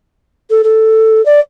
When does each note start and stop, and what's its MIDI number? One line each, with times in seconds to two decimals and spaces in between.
0.50 0.61 69
0.63 1.23 69
1.25 1.39 74